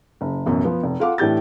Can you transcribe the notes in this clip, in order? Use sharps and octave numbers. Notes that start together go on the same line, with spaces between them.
F#1
A1 F#2 B2
F3 B3
F1
F4 A4 F5 F#5 D6
A2 E3 D4 G4 G6 A6